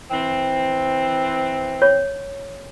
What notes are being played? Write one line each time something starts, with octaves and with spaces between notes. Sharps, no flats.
E3 C4
C#5